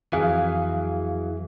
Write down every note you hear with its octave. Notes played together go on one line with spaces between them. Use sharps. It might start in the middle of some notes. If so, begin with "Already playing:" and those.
F2 E3 F#3 G#4 F5